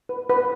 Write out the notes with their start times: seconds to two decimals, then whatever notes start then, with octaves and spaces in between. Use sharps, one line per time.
0.09 B4
0.30 B4